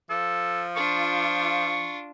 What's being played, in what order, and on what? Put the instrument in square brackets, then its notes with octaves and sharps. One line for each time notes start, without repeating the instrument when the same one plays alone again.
[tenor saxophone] F3 [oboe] A4
[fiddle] D4 F4 [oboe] C#6